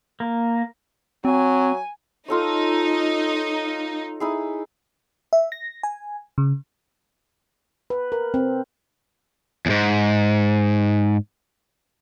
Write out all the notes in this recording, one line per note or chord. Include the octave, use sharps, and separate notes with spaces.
A#3
F#3 C4 G#5
D#4 F4 A4 C#5
D#4 E4 G#4
E5
A#6
G#5
C#3
B4
A#4
C4
E2 G#2